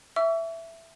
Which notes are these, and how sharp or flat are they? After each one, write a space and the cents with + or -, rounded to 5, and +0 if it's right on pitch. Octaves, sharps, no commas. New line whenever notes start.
E5 +5 C#6 +45 E6 +30